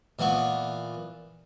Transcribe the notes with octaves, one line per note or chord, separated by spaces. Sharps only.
A#2 E3 B3 C#6